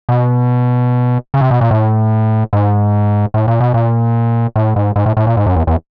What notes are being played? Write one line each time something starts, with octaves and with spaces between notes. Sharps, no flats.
B2
C#3
C3
B2
A#2
A2
G#2
A2
A#2
B2
A#2
A2
G#2
G#2
A2
A2
A#2
G#2
F#2
E2
E2